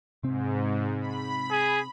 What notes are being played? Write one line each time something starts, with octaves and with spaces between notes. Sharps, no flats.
G#2 C3 C4
B5
G#4